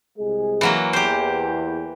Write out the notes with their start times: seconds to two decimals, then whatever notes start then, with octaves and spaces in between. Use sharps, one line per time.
0.19 C2 G#3 G#4
0.61 E3 F#3 A#3
0.93 E2 G4 C5